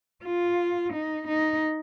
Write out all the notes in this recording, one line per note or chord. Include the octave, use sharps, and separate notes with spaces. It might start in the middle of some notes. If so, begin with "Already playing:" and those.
F4
D#4
D#4